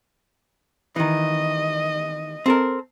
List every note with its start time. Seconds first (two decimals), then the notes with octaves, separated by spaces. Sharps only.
0.96 D#3 E3 D#5
2.46 C4 A4 A#4